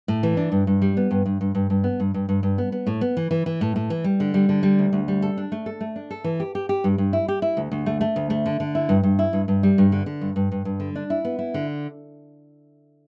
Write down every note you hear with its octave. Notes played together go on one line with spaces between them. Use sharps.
A2
E3
D4
G2
G2
G3
B3
G2
G2
G2
G2
G2
B3
G2
G2
G2
G2
B3
B3
A2
B3
E3
E3
E3
A2
A2
E3
G3
D3
G3
D3
G3
D2
D2
G3
A4
D4
A3
A4
A3
D4
A4
E3
G4
G4
G4
G2
G2
E4
G4
E4
D2
D2
A3
A3
D2
A3
D3
D3
E4
G2
G2
E4
G2
G2
G3
G2
D3
D3
G2
G2
G2
G2
D3
D4
E4
B3
E4
D3